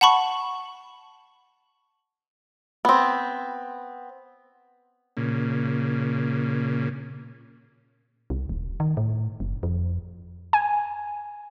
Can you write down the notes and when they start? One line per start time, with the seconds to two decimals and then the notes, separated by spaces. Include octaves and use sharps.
0.01 F#5 A5 B5 C#6
2.85 B3 C4
5.17 A#2 C#3
8.30 C2
8.49 D#1
8.80 D#3
8.97 A2
9.40 F#1
9.63 F2
10.53 G#5